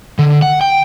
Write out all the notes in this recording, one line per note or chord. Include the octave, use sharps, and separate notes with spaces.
D3
F#5
G5